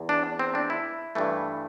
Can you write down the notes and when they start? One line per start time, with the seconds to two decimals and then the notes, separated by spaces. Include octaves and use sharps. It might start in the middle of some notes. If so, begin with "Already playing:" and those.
Already playing: E2
0.09 D4
0.39 C4
0.55 D4
0.70 E4
1.15 G2 E3 A3